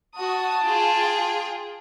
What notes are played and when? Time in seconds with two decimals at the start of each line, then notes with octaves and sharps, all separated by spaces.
0.16 F#4 A5 D#6
0.65 F4 G#4 G5